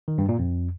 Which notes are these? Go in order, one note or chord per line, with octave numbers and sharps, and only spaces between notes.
D#3
G2
A#2
F2